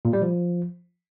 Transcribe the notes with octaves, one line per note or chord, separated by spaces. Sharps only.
A#2
G3
F3